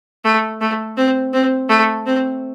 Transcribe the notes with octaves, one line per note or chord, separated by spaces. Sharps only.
A3
A3
C4
C4
A3
C4